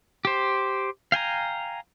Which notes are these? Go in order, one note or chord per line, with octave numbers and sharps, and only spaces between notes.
G4 C5
F5 G5 G#5 A#5